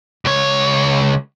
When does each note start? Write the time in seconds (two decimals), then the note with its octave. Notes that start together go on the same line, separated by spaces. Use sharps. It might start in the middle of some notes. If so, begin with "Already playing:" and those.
0.25 C#2 C#5